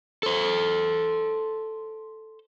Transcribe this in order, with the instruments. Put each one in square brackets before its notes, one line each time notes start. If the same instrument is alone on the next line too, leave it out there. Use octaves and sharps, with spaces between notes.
[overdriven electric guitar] A4 C5